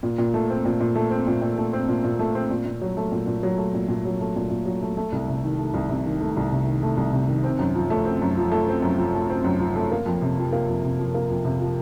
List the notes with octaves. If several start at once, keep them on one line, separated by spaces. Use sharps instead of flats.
A#2
A#2
A3
C4
A#2
A#2
A3
C4
A#2
A#2
A3
C4
A#2
A#2
A3
C4
A#2
A#2
F#3
A3
A#2
A#2
F#3
A3
A#2
A#2
F#3
A3
A#2
A#2
F#3
A3
A3
C2
C3
D#3
A3
C2
C3
D#3
A3
C2
C3
D#3
A3
C2
C3
D#3
C4
F#2
F3
A3
C4
F#2
F3
A3
C4
F#2
F3
A3
C4
F#2
F3
A3
A#3
F2
C3
F3
A#3
F2
C3
F3
A#3
F2
C3
F3